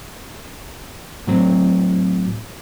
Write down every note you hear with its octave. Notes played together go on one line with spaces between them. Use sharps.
A2 F#3 C4